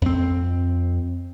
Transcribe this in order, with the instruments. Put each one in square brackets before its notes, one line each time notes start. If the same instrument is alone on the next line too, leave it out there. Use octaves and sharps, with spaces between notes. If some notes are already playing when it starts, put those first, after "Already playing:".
[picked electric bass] F2 C4